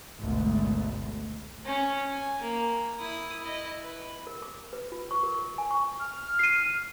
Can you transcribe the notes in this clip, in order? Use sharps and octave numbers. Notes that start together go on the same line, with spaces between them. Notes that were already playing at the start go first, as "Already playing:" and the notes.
G#1 D2 B2 A3
C#4
G#5
A#3
E4 D#6
E4 D#5
B4
A#4
D6
B4
F4
C#6
A#4
G#5
C#6
F6
C7 D#7